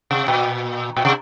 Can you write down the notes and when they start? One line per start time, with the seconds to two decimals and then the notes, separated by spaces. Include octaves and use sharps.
0.11 C3
0.28 A#2
0.97 A#2
1.05 C3